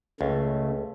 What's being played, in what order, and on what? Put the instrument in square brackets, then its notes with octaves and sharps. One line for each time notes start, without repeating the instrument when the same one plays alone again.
[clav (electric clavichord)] C#2 [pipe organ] C#3 A3